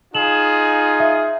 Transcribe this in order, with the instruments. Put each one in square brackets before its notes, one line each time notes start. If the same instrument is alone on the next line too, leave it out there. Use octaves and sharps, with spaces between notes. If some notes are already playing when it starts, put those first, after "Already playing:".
[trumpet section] D#4 F4 G#4 [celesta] E7 F#7
[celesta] E5